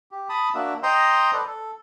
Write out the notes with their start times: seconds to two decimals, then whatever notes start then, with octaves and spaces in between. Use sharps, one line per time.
0.11 G4
0.29 A5 B5 D#6
0.54 A#3 D4 F#4 E5
0.83 C5 D#5 G5 A#5 C6
1.33 A4 B4 D5
1.47 A4